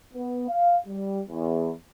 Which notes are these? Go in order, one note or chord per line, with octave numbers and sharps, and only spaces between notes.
B3
F5
G3
E2